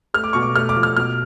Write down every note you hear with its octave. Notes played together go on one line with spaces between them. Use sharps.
A3 F6
D6
B2 C#6
D6
A3 F6
D6
F3
F6
B2 F6